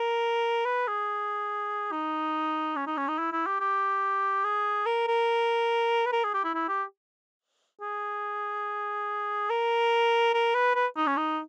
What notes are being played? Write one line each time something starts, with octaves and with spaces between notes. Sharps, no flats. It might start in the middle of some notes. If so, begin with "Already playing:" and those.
Already playing: A#4
B4
G#4
D#4
C#4
D#4
C#4
D#4
E4
E4
G4
G4
G#4
A#4
A#4
B4
A#4
G#4
G4
E4
E4
G4
G#4
A#4
A#4
B4
B4
D#4
C#4
D#4